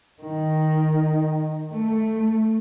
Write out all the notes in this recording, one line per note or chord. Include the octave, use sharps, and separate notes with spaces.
D#3
A3